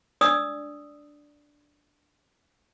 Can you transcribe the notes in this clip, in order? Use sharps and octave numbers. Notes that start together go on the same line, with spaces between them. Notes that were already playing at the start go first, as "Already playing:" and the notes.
D4 D5 D#6 E6